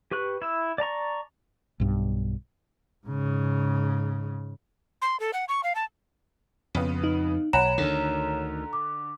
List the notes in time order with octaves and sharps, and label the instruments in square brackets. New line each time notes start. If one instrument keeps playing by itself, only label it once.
[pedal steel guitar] G4 B4 C#6 F#6
E4 E6
D5 A5 A#5 C#6
[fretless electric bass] B1 G2
[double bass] G#2 C#3
[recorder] C6
A4
F#5
C#6
F5
A5
[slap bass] F2 [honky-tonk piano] C#3 B3
[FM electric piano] D#4
[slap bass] B1 [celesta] C#5 E7 [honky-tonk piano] F#5 G#5 B5 [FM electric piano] A#5
[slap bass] D2 D#3 [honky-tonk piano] D3
[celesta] D6